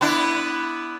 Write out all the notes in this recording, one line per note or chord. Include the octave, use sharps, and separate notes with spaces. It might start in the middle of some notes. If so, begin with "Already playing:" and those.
B3 D4 E4